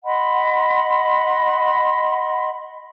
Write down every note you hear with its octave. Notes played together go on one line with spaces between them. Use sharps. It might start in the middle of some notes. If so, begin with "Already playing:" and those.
D#5 F#5 B5 C6